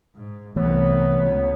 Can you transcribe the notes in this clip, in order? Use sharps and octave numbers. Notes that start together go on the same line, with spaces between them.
G#2
C2 E3 A3 B3 C#5
C#2